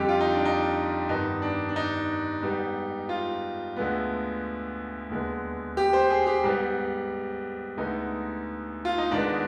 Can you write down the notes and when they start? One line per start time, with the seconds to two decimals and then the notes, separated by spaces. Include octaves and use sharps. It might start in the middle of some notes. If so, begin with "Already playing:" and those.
Already playing: F2 D3 G3 G4
0.09 F4
0.21 D#4
0.34 D4
0.45 D#4
1.09 G2 D#3 B3 D#4
1.42 D4
1.69 D4
1.76 D#4
2.43 G#2 G3 B3
3.09 F4
3.76 D2 D3 G#3 B3
5.10 D#2 D3 G#3 B3
5.77 G4
5.93 C5
6.10 G#4
6.27 G4
6.44 G#2 G3 B3
7.77 D2 D3 G#3 B3 D#4
8.85 F4
8.98 D#4
9.11 G#2 D#3 G#3 B3 D4